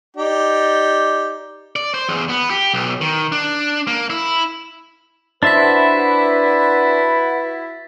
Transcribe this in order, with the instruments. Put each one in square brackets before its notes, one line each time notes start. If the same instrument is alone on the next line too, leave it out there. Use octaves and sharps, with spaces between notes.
[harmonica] D#4 G4 D5
[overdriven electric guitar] D5
C5
E2
B3
G4
B1
D#3
D4
A#3
E4
[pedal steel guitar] D4 C5 E5 [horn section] E4 [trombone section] F#4 B4 [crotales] A6 B6